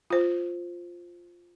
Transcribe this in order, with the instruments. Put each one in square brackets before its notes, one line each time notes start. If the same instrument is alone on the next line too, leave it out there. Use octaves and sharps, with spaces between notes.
[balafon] F4 C5